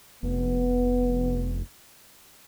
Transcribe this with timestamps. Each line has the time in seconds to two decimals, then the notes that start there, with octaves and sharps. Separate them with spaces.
0.23 F1 B3